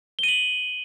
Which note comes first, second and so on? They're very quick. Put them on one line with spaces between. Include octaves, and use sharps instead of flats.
G7 D#7 F#7